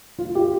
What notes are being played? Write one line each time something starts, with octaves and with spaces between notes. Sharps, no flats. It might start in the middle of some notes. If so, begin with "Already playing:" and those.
F4
G4